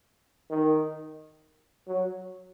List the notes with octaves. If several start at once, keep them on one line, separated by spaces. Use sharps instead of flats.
D#3
F#3